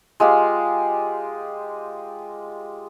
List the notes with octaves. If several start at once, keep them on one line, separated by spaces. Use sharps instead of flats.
G#3 F4 G4 F5